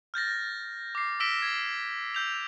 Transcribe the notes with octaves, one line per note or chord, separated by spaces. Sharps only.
F6 G6 A6 A#6
D6 C7
E6 A#6 B6 D7 E7 G7
G#6
E6 G6 F7